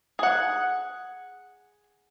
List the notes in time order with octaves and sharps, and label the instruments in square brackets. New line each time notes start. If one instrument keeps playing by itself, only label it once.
[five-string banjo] G#4 F#5